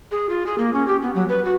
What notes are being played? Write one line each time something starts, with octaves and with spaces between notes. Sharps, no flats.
G#4
F4
G#4
A#3
C#4
G4
B3
F#3
B4
F#4